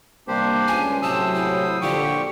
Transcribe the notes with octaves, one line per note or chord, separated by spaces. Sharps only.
C3 G3 A#3 D4 G4 C5
C#2 G#5
A2 C3 F#3 C5 A5 D#6 E6
E4
A#2 D3 F3 G4 G5 C#6